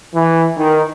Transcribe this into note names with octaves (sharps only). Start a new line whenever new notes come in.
E3
D#3